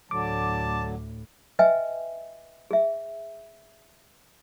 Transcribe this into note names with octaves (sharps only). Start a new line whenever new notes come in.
D2 A2 D3 F#3 A5 D6
B4 D#5 E5 G5 G#5
G#4 E5